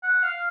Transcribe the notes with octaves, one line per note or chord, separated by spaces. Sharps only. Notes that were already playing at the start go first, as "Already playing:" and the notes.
F#5
F5